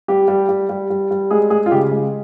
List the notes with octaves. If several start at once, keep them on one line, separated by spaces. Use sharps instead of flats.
G3 G4
G3
G3
G3
G3
G3
G#3 G#4
G#3 G#4
F4
C#3 G4
G#3